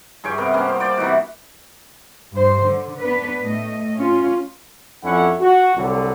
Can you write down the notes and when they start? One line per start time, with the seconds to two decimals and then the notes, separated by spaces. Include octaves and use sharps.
0.24 G2 G#4 C#5 G5
0.38 C3 B3 A#4
0.54 A#3 C#4
0.69 C5
0.80 D5 G5
0.97 C3 E3 D#4 F#4
2.33 G2 C5
2.65 D3
2.99 B3 D4 B4
3.41 A2 A3 D#5
3.97 C#4 F4
5.04 F2 C#4 D4 E4 A4 F#5
5.41 F#4
5.75 C2 D3 F#3